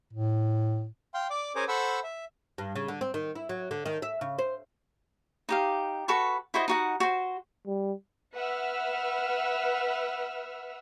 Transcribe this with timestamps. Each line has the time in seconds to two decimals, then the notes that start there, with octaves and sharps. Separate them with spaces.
0.13 A2
1.14 F5 G5 C6
1.30 D5 D6
1.56 C#4 G#4 A#4 C5 C#5 D6
1.68 A4 C5 F#5 B5 C#6 E6
2.04 E5
2.58 G2
2.76 C#3
2.88 D3
3.01 C4
3.14 D#3
3.35 E4
3.49 F#3
3.71 D3
3.86 D#3
4.02 E5
4.21 C#3
4.38 C5
5.49 D#4 G4 F5
6.08 F#4 A4 B4 C#6
6.54 E4 F#4 C5 D#5
6.68 D#4 F#4 F#5
7.00 F#4 C5
7.66 G3
8.34 B4 E5 F#5 E6 F6